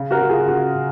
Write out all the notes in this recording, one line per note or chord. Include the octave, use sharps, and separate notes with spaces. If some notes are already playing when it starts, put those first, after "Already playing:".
Already playing: C#3
F#4 A#4
C#3
F4 G#4
C#3 F#4
C#3